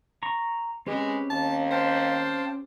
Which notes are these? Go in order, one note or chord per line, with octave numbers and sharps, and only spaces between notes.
A#5 C#6
G#3 C4 C#4 G4 B4
D#2 A5
C5 F5 G5 A5